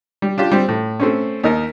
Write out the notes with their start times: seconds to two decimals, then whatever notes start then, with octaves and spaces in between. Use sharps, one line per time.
0.22 G3
0.38 D4 F4 G4
0.52 G3 C4
0.69 A2
1.00 A3 C4 C#4
1.43 D#2 D#4 A#4